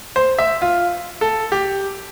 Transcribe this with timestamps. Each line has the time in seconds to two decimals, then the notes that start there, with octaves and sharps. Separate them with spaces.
0.16 C5
0.39 E5
0.62 F4
1.21 A4
1.52 G4